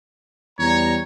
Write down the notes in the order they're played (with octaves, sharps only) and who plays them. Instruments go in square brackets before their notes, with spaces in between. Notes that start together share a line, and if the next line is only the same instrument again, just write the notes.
[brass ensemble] E2 G3 A#5 [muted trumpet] C#5